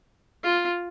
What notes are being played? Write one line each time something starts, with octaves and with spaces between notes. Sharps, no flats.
F4